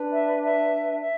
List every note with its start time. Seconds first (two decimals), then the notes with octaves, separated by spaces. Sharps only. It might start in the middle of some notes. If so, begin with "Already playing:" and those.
Already playing: D4 B4
0.13 E5
0.43 E5
1.02 E5